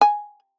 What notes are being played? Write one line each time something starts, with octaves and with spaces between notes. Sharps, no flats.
G#5